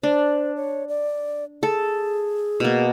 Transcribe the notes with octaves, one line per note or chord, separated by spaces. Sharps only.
D4 C5
C#5
D5
G#4 A4
B2 A#3